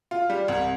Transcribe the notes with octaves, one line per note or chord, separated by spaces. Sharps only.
F4
G3
C2